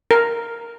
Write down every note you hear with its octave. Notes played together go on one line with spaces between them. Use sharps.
A#4